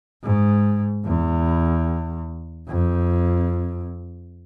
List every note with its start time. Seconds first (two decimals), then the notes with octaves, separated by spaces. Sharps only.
0.23 G#2
1.05 E2
2.68 F2